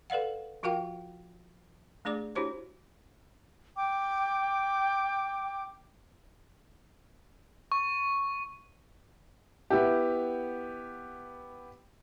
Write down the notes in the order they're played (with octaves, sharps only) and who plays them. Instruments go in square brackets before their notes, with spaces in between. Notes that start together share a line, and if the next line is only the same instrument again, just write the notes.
[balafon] A4 B4 D5 F5 F#5
F3 F4 F#4 A#4 F5 G5
A3 D4 G#4 D5 D6
D4 E4 F#4 G4 C5 C#5
[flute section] G5 D6
[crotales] C#6
[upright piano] B3 E4 G4